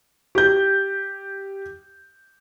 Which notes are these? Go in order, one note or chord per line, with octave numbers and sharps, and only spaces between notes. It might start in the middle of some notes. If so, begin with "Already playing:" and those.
G4 G6